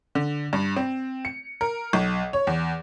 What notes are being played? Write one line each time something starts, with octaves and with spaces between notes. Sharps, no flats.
D3
G2
C4
C#7
A#4
B1
C#5
E2